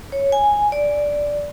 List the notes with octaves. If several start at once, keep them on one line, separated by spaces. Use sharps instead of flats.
C#5
G#5
D5